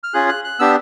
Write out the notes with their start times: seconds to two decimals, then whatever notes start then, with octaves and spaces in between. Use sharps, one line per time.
0.03 F6
0.14 C#4 F4 G#4 F#6
0.29 F#6
0.44 F#6
0.59 B3 D4 G4 E6